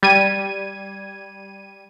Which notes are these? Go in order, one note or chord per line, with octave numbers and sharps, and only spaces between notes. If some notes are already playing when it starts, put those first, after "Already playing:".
G3 G#6 D#7